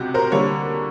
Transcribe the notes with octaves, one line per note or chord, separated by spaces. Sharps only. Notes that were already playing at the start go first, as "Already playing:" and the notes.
Already playing: C#2 C3 F#4 G4
A#4 C5
D3 G3 A#3 C#5